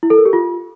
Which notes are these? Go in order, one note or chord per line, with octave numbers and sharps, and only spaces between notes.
E4
A4
A#4
G4
F4